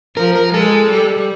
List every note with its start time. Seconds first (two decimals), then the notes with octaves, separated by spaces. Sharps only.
0.17 F3 A#4
0.35 A#4
0.53 G#3 A4
0.90 G3